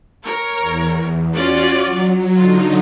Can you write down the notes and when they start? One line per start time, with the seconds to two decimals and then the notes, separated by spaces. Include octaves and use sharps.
0.24 A#4 C#5
0.60 E2
1.33 C#4 F4 F#4 C#5 D5
1.85 F#3
2.36 D3 F#3 D#4 F4